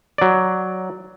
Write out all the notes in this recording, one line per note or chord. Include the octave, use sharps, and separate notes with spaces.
F#3 D5